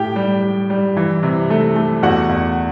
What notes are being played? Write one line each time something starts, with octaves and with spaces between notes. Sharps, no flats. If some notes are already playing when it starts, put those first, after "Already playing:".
Already playing: A2 G4 G5
G3
G3
G3
E3
C3
A3
A3
E2 F#4 F#5
E2